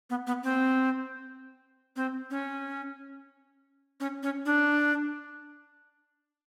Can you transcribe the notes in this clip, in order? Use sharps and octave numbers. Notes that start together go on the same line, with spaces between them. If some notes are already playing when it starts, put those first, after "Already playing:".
B3
B3
C4
C4
C#4
C#4
C#4
D4